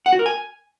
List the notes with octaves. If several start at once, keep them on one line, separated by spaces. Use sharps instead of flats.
F#5
F#4
A#4
G#5